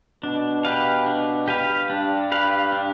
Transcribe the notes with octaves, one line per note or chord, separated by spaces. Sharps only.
B2 D4
G4 B4 F5
D4
G4 B4 F5
G2 D4
G4 B4 F5
D4